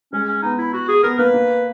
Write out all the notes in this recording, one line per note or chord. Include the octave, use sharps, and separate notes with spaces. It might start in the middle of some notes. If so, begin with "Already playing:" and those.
G#3 C#4
C#4
B3 D#4
E4
F#4
G#4
B3 A#4
A#3 B4
A#3